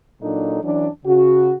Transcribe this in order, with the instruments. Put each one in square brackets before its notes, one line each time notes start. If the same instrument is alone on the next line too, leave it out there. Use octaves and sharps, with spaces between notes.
[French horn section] A#2 F#3 D4 D#4 A4
E3 F#3 C#4 D4
C#3 F#4